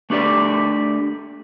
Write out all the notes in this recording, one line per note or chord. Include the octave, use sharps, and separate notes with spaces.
A3 D4 G4 A4 D5